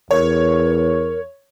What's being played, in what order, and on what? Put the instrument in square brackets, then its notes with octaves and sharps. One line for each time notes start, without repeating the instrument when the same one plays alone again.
[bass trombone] E2 [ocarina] A#4 [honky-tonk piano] C#5